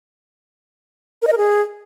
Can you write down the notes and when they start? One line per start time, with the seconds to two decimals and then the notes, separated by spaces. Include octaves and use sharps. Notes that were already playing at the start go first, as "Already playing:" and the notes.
1.22 A#4
1.27 D#5
1.32 A#4
1.37 G#4